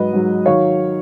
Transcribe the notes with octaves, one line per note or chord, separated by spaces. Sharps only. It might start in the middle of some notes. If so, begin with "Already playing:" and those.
Already playing: G#2 F#3 B4 D#5
G#2 F#3
D#3 F#3 C#5 F5